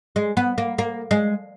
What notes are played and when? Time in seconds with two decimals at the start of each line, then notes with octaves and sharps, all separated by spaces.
0.16 G#3
0.37 B3
0.58 A#3
0.78 A#3
1.11 G#3